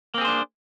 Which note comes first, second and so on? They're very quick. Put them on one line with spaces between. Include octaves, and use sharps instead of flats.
A#3 C4 G#4 C5 D4